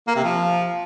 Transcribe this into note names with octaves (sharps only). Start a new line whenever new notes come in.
A#3
C3
F3